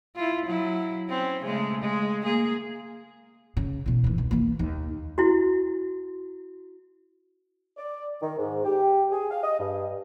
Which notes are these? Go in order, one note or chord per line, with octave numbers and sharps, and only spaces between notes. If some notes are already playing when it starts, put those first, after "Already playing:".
E4 F4
F#3 E4
C4 C#4
C#3 G#3 A3
G#3
A#3 G#4
C#3
E2 B2
D#2 E3
C2
E3 A#3
D#2
E4 F#4
D5
D#3
G#2
G4
G#4
F5
D#5
G2